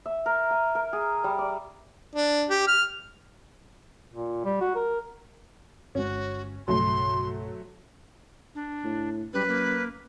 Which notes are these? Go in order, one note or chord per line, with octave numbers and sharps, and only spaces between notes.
E5
A#4
G#5
A#4
G#4
G3
D5
D4
G4
F6
A#2
G3
F#4
A#4
G1 G#3 C#4 F#4
B1 G2 C#3 F#3 A3 C6
D4
A2
F#2 G3 B4
A#3